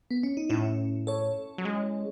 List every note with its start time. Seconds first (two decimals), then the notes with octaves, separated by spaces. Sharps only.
0.11 B3
0.23 C#4
0.37 D#4
0.49 A2 C#4 E4
1.07 A4 C#5
1.58 F#3
1.65 G#3